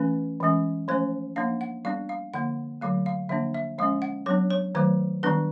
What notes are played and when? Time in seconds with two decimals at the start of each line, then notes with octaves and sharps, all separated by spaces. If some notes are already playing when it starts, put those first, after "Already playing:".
Already playing: E3 A3 C#4 B4
0.40 E3 G#3 C#4
0.88 F3 A3 C#4 C5
1.36 F3 A#3 D4 F5
1.61 F#5
1.85 G3 B3 D4 F5
2.09 F5
2.34 D3 F3 A#3 F#5
2.81 D3 F#3 A3 F5
3.06 F5
3.29 D3 F3 A#3 D4 E5
3.55 E5
3.78 F3 G#3 C#4 F5
4.02 F#5
4.26 F#3 B3 D4 C#5
4.50 C#5
4.75 D#3 F#3 A3 C5
5.23 D#3 G3 B3 D4 B4